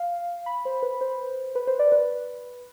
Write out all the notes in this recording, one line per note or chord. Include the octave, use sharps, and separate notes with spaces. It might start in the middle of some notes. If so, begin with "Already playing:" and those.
Already playing: F5
B5
C5
B4
C5
B4
C5
D5
B4